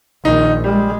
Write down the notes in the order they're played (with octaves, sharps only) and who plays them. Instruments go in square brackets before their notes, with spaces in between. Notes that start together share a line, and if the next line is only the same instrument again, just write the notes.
[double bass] A#1 D#3 [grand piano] D#4
[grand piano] G3 [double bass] G#3